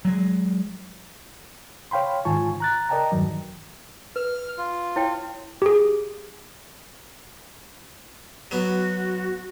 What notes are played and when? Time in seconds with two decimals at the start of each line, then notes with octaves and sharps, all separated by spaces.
0.05 F#3 G#3
1.91 C#5 F5 G5 B5 C6
2.25 G#2 D#3 F4 G#5 A5 C#6
2.60 A#5 F#6 A6
2.89 A#4 D5 D#5 G5 A5 A#5
3.12 E2 G2 D#3 F#3
4.16 B4 F6
4.58 F4
4.96 E4 C#5 G5
5.62 G4 G#4
8.51 F#3 B3 F#4